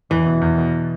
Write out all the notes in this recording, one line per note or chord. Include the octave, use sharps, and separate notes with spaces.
E2 E3
B2
E2
B2